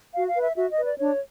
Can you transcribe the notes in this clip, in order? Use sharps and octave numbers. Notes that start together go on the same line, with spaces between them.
F#4 F5
F5
B4
E5
F#4 E5
D#5
B4
D5
D4 C#5